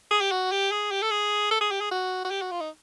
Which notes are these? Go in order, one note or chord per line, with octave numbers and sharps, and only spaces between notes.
G#4
G4
F#4
G4
G#4
G4
A4
G#4
A4
G#4
G4
G#4
F#4
F#4
G4
F#4
F4
D#4